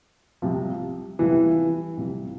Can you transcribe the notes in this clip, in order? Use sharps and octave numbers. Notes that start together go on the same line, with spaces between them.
C2 C3 F3
C2 C3 E3 F3
C2 C3 F3